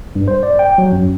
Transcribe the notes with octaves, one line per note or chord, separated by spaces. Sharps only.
G2
C5
D5
G5
F#3
F#2